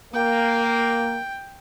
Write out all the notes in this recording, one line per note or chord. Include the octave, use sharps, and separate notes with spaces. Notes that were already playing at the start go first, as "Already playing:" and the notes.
A#3 G5